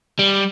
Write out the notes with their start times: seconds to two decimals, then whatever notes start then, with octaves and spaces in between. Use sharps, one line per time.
0.19 G3